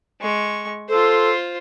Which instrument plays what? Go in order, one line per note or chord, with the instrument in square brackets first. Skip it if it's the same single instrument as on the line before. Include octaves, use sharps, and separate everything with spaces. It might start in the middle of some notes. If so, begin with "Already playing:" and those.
[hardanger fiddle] G#3 C#6
[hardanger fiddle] F4 C5 [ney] A4